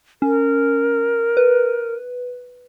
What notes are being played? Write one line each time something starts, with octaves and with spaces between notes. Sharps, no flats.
C#4 A#4
B4